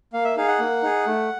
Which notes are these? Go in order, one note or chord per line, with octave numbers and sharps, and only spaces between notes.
A#3 F5
E5
D#4 G#4 F5
F#5
A#3
D#4 G#4
A3